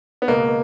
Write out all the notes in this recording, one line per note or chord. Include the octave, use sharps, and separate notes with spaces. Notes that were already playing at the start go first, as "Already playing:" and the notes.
B3
C#2 B2 A#3